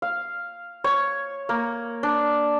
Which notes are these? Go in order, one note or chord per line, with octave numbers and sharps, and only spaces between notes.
F5
C#5
A#3
D4